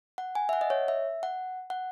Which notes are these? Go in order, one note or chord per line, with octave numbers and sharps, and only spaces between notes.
F#5
G#5
E5
F#5
D#5
C#5
E5
F#5
F#5